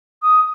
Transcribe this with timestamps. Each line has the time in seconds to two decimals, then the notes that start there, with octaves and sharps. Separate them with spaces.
0.22 D#6